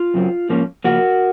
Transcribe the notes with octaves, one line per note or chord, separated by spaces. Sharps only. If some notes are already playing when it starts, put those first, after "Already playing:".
Already playing: F4
F#2 C#3 F#3 C4
G#2 F3 A#3 C#4
C#3 F3 A#3 F#4 A#4